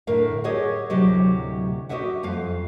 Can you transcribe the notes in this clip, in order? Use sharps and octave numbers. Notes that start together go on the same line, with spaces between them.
A2 D3 A#4 F5
G4 G#4 C#5 D#5 F#5
D2 A2 C3 F#3 G4 D#5
F#4 G4 B4 D#5 E5 F#5
F2 F4 F5